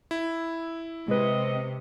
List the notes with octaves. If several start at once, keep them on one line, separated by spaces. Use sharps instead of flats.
E4
C3 G#3 B4 D#5